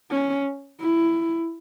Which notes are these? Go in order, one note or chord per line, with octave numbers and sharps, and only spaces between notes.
C#4
E4